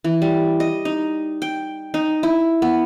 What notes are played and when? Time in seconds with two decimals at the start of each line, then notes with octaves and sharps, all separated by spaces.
0.04 E3
0.22 G3
0.60 D#5
0.85 D#4
1.42 G5
1.94 D#4
2.23 E4
2.62 B3